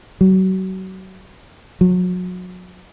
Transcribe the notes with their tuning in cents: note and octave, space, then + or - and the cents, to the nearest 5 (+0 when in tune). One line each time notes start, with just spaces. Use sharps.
F#3 +30
F#3 -30